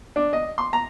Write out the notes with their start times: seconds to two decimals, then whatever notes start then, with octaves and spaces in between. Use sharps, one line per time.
0.16 D4
0.33 D#5
0.58 C6
0.73 A#5